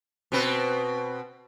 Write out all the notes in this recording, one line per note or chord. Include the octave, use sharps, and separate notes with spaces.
B2 C4 B4